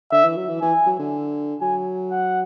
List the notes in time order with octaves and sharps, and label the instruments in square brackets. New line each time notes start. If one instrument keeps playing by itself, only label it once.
[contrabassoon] D3 [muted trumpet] E5
[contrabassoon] E3
F#3
E3
[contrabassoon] E3 [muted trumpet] G#5
[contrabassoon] F#3
D3
[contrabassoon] F#3 [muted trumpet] G#5
[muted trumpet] F#5